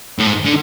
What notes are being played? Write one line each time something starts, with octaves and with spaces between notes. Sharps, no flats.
A2
G#2
D3